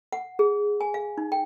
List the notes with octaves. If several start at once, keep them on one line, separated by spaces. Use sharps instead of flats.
F#5
G#4
G#5
F5
D#4
G5